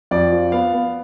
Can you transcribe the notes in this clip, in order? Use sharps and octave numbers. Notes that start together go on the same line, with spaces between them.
F2 D5
F3
B3 F5
B3